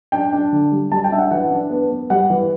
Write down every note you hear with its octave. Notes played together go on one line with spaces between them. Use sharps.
D4 G5
D4
D3
G3
G3 A5
G5
D4 E5
F#5
E3 F#5
D4
B3
B3
G3 F#5
E3